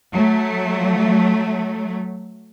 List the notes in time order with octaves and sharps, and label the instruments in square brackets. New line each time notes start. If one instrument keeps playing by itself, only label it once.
[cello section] F#3 A3